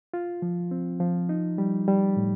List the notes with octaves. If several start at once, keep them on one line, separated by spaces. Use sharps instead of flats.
F4
F3
C4
F3
D#4
G3
G3
A2